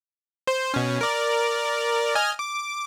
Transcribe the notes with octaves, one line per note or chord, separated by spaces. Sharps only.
C5
B2 C#4
A#4 D5
D#5 G#5 F6
D6